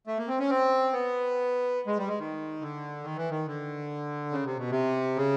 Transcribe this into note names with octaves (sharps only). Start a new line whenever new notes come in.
A3
A#3
C4
C#4
C4
B3
G#3
G3
G#3
D#3
D3
D#3
E3
D#3
D3
C#3
C3
B2
C3
C#3